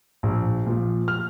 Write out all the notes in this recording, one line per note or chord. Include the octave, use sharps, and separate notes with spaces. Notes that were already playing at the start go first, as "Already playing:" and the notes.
A#1
A#2 F3
F6